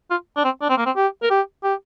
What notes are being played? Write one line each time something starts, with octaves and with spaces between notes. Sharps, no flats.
F4
D4
C4
D4
C4
A#3
C4
G4
A#4
G4
G4